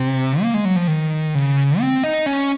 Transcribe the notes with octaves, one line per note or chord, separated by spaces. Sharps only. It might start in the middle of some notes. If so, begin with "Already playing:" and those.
Already playing: C3
A#3
G#3
F#3
F3
D#3
C#3
C4
D#4
C#4